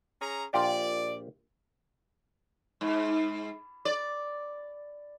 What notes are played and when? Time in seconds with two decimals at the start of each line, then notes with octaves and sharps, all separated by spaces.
0.21 C#4 G#4 A#5
0.54 A#1 F4 G4 D5
2.81 G#2
3.85 D5